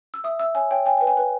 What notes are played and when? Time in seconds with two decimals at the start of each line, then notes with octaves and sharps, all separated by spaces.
0.14 E6
0.24 E5 D#6
0.40 E5 E6
0.55 C#5 G#5
0.71 C#5 G5
0.86 G5 G#5
0.97 B4 G5
1.07 G#5
1.17 B4